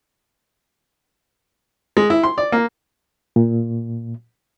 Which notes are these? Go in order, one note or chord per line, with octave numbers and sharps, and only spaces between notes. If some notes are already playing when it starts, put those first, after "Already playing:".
G#3
E4
C6
D5
A#3
A#2